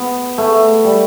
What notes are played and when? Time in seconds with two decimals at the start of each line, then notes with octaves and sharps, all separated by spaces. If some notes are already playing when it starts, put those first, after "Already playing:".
Already playing: B3
0.38 A3
0.84 G3